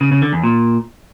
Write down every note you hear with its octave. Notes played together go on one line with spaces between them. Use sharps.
C#3
C#3
D3
E2
A#2